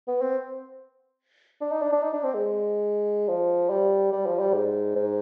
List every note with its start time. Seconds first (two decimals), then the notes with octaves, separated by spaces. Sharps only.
0.07 B3
0.21 C4
1.61 D4
1.71 D#4
1.82 D4
1.92 D4
2.03 D#4
2.13 D4
2.23 C4
2.34 G#3
3.28 F3
3.70 G3
4.12 G3
4.26 F3
4.40 G3
4.54 G#2
4.95 G#2